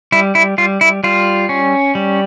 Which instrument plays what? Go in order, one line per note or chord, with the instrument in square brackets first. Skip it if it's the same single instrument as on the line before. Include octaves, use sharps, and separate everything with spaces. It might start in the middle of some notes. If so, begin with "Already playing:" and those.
[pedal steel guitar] G3 E4
E4
G3 F4
E4
G3 F4
C#4
G3